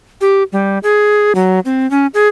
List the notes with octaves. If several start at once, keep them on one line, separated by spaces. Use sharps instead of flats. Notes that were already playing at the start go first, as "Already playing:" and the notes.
G4
G3
G#4
F#3
C4
C#4
G#4